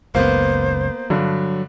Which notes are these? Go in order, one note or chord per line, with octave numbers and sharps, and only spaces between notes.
F#1 C#2 A#3 B3 C5
G2 D3 F#3